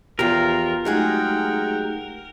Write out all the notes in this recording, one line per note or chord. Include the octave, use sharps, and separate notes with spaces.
E2 F3 F4 G4 A#4
F#3 G#3 A3 D#4 G4 G#4 F#5 G5